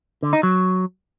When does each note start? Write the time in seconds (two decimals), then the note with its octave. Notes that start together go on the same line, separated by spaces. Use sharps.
0.23 D3
0.33 D#4
0.43 F#3